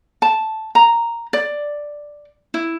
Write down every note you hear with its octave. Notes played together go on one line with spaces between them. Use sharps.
A5
A#5
D5
E4